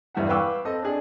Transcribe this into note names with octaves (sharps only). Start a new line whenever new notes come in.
E1 E2 G2 E3 E5 F#5
B4 F5 G5 C#6 D6 E6
C4 A4 D#5
D4 G#4